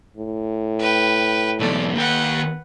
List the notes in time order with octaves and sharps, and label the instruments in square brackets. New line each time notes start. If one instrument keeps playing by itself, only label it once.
[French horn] A2
[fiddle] B4 G5
[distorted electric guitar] B1 E2 [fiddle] A3 D5
[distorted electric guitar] D#2 G5 [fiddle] B4 F#5